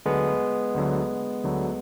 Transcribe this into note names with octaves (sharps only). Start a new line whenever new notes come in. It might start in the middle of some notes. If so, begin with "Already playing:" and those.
D2 D3 F#3 G#3 B3
D2 D3 F#3
D2 D3 F#3